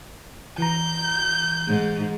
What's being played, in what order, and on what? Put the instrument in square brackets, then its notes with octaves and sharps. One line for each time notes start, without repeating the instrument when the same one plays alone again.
[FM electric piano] E3 A#5 [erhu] G6
[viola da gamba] G#2